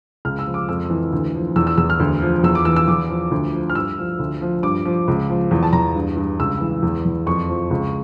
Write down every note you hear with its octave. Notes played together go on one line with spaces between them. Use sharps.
C#2 F6
E6
F3
D6
F2 E6
E3
D2
F3
E2 E6
E6
E2 E6
F6
D2
F3
E2 E6
D6
E3 E6
E6
E2 D6
F3
D2
F3
F6
G2 E6
F3
D2
F3
G2 D6
F3
C#2
F3
E2
A5
E2 A#5
G2
G2
C#2 E6
E3
E2
E2
F2 C#6
F3
C#2